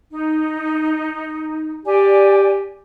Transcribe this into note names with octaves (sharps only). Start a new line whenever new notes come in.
D#4
G4 D5 G#5